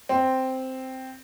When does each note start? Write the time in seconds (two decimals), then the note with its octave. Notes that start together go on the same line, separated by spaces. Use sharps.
0.09 C4